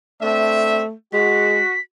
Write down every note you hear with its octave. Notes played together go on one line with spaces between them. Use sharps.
A3 C4 D4 E5
G#3 F#4 B6